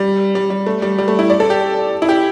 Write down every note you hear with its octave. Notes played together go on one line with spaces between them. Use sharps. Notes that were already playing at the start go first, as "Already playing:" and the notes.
Already playing: G3
G3
G3
A3
G3
G3
A3
E4
D5
A4
G4
E4
G4